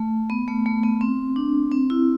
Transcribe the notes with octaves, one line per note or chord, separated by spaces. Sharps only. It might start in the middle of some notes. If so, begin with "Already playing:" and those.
Already playing: A3
B3
A3
A3
B3
C4
D4
C4
E4